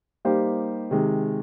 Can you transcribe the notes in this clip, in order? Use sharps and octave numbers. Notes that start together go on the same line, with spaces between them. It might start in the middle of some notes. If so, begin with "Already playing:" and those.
G3 A#3 D#4 G4 C5
C3 D#3 G#3